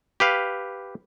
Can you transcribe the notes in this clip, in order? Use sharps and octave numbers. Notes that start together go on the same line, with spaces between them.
G4 B4 F5